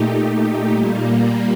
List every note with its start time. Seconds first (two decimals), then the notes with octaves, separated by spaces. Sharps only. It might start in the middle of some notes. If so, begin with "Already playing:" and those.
Already playing: A#2 A3 D#4 G4
0.73 A#2 G3 A#3